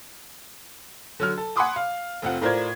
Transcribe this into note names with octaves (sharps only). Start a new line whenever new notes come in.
D3 F#3 F6
A4
F#5 G#5 B5 C6 D6 D#6
F5
F1 C3 F4 F#5
A2 F4 A#4 C5 D5 G#6